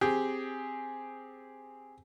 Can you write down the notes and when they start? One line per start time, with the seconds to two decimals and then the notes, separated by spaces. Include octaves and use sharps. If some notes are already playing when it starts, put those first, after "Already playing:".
0.01 C4 G4 G#4